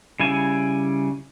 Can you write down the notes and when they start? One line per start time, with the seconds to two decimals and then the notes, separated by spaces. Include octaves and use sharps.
0.20 C#3 G3 E4 G#5